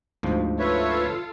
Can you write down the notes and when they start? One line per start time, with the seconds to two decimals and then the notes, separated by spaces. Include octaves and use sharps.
0.23 D2 G#2 F3
0.59 F4 A4 B4 C#5 E5